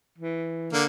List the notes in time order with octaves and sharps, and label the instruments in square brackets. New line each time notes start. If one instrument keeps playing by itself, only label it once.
[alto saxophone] E3
[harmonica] D3 A#3